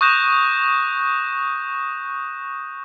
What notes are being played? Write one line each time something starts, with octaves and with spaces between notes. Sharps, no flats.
C#6 D#6 F#6 G6 A#6 E7